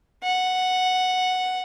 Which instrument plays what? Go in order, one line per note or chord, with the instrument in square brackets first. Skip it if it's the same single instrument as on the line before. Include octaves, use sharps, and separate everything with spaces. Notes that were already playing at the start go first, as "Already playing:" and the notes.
[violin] F#5